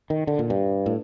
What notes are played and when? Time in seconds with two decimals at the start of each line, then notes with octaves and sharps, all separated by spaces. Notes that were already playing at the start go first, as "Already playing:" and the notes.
0.10 D#3
0.27 D3
0.39 A#2
0.50 G2
0.86 A2